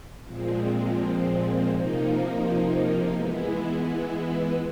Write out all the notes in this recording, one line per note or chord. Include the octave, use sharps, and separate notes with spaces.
A#2 F3 G#3 C4
C3 F3 A#3 D#4
E3 G#3 B3 E4